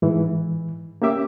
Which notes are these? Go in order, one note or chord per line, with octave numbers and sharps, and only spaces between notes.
G#2 E3
A#3 C#4 G4 E5 D6